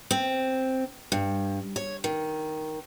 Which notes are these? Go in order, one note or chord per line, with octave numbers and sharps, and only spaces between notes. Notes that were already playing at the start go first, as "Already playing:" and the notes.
C4
G2
C#5
D#3